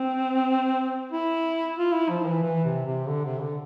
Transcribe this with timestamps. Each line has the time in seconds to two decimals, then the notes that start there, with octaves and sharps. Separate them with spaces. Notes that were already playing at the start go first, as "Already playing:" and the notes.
Already playing: C4
1.12 E4
1.77 F4
1.93 E4
2.09 F3
2.26 E3
2.42 E3
2.64 C3
2.86 C3
3.08 D3
3.25 C3
3.40 D3